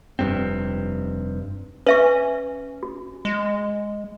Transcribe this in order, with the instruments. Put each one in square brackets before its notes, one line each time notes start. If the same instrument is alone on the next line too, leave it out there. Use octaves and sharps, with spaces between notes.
[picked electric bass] F1 G2 C3 C4
[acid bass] C#4 [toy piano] B4 E5 C#6
[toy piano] F#4
[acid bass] G#3